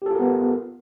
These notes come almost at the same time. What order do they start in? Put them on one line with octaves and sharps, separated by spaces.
G4 A4 F4 A#4 B3